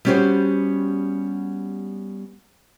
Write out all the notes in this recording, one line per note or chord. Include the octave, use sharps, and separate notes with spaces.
G3 B3 C#4 F#4 G4 C5